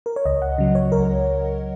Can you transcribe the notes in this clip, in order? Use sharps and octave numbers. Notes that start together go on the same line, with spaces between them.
A#4
C#5
C#2 D#5
F#5
C#3 F#3
C#5
C#2 A#4